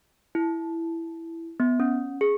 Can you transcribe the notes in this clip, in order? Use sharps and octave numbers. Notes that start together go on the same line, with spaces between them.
E4
B3
C#4
G#4